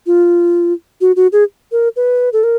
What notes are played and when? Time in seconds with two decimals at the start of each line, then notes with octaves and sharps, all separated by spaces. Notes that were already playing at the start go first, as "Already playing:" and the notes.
0.07 F4
1.01 F#4
1.16 F#4
1.32 G#4
1.72 A#4
1.96 B4
2.33 A4
2.43 A#4